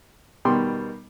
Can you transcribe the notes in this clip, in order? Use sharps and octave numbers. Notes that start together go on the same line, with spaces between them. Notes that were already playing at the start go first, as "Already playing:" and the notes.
B2 D#3 G3 G5 C6